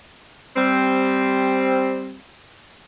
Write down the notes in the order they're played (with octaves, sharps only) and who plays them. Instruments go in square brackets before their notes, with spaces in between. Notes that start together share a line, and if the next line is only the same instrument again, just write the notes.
[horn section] G3 C4